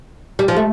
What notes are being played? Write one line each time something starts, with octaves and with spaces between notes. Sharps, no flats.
G3
F3
A3